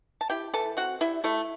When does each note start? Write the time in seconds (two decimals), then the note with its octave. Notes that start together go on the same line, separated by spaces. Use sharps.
0.21 A5
0.30 E4 G4 G5
0.53 E3 A4 A5
0.77 C4 F#4 F#5
1.01 G3 E4 E5
1.24 A3 E4 A4